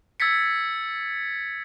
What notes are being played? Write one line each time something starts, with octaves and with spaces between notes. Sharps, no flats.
E6 G#6 A6 B6 C#7